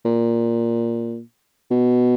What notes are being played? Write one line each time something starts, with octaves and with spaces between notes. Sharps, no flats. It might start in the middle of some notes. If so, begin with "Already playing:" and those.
A#2
B2